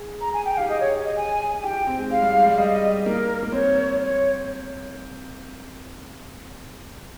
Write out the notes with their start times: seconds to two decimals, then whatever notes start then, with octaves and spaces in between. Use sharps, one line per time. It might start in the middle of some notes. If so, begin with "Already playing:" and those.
Already playing: G#4
0.21 A#5
0.33 G#5
0.45 G5
0.57 G4 F5
0.68 G#4 D#5
0.81 C#5
1.04 D#5
1.17 G#5
1.64 G4 G5
1.75 G4
1.87 C4
1.98 G#3
2.10 G#3 F5
2.22 G3
2.35 G#3
2.46 G3
2.51 F5
2.58 G3 D#5
3.05 A#3 A#4
3.43 A#3
3.52 C4 C#5
4.01 C#5